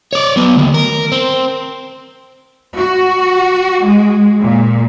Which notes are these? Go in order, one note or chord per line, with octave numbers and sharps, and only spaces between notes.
C#5 D5
F#3 B3
D2 D#3
A#4
C4
F#4
G#3
A#2